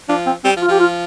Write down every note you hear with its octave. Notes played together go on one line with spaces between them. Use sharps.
F3 D4
C4
G3 C4
F3
F4
F3 G4
F4